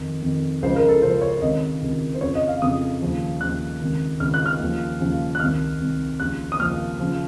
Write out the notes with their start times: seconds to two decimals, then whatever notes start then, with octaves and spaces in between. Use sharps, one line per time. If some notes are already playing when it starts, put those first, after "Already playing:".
Already playing: F2 D#3
0.22 F2 D#3
0.63 C#2 C#3 F3 C5
0.76 A#4
0.88 A4
1.02 C#2 C#3 F3 C5
1.22 C#5
1.41 C#2 C3 D#3 D#5
1.82 C#2 C3 D#3
2.15 C5
2.21 F2 C#3 F3 C#5
2.35 D#5
2.48 F5
2.62 F2 C#3 F3 D#6
3.02 D#2 C#3 F3
3.41 D#2 C#3 F3 F#6
3.81 C#2 C3 D#3
4.20 C#2 C3 D#3 F6
4.34 F#6
4.46 F6
4.60 D#2 C#3 F3
5.00 D#2 C#3 F3
5.35 F#6
5.40 C2 C3 D#3 F6
5.80 C2 C3 D#3
6.20 D#2 C#3 F3 F#6
6.52 D#6
6.60 D#2 C#3 F3 F6
7.00 C#3 F3